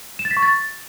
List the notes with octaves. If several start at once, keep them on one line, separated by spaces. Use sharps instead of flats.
E7
A6
B6
C#6
A6